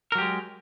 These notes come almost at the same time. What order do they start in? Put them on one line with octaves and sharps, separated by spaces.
A#4 F#3 G4 G#3